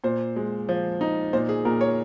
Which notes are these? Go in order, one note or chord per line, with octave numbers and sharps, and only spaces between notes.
A#2 C5
G#3
F3
D#4
A#2 C5
G#4
A#2 A#4
C#5